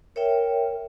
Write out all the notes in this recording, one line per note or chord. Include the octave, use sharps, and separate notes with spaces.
A#4 C#5 E5 G5